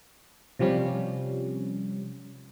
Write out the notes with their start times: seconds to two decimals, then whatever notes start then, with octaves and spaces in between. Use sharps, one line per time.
0.59 C3 F3 G3 C#4